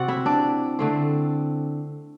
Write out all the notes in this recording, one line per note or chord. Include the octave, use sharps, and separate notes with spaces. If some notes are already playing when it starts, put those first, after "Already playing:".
Already playing: C3 C4 F#4 D5 F#5
E4 E5
D4 D5
D3 A3 C4